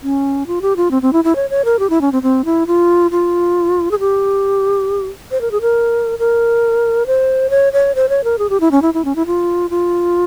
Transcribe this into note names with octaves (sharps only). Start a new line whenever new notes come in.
C#4
F4
G4
F4
C4
C4
E4
E4
C#5
C#5
A#4
G4
E4
C#4
C4
C4
E4
F4
F4
G#4
G4
C5
A#4
G#4
A#4
A#4
C5
C#5
C#5
C5
C#5
A#4
G#4
G4
E4
C#4
E4
E4
C#4
E4
F4
F4